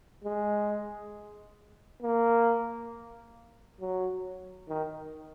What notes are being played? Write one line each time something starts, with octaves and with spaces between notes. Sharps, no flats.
G#3
A#3
F#3
D#3